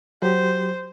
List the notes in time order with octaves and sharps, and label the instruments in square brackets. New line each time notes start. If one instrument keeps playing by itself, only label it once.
[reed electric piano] F#3 G4 [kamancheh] C5